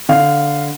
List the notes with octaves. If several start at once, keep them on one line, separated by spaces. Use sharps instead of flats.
D3 F5